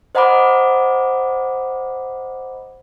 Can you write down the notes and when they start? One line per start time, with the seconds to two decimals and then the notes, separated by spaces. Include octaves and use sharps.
0.15 C5 D#5 F#5 A#5 B5 D6